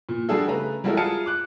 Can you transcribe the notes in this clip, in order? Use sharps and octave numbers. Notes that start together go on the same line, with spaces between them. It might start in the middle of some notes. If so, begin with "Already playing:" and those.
A#2
G3 D4 F#4 G#4 A4
C#3 A3 B4 A#5
G3 G#3 E4 F#4 A4 A#4
F4 G#4 G#5 A5 F6 C#7
D6 F#6